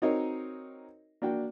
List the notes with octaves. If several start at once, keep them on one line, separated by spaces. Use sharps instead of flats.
C4 D#4 F#4 A#4 C#5 D#5
A#3 D4 F#4 G5